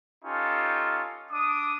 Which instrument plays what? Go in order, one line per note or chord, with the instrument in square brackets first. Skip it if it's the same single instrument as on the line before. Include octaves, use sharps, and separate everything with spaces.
[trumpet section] C#4 D#4 F4 G4 A4
D4 D6 D#6